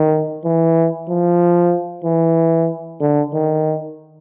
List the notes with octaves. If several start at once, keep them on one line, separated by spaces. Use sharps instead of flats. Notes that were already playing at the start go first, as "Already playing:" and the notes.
Already playing: D#3
E3
F3
E3
D3
D#3